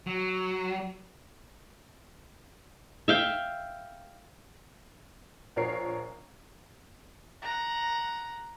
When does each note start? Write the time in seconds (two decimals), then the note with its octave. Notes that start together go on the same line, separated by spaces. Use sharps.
0.07 F#3
3.08 E5 F5 G5
5.56 A#1 F3 A#4 C#5 C7
7.42 F#5 A#5